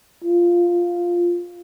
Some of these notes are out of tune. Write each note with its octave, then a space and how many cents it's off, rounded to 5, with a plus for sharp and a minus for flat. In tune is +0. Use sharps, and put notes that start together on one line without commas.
F4 +0